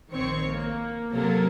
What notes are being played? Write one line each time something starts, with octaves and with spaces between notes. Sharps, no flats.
A#1 D#3 C4 C#5 C#6
A#3
C3 F#3 A#3 A4 A#4